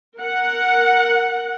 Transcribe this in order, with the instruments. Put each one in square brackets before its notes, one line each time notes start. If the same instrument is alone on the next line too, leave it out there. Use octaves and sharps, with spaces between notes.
[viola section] A#4 F#5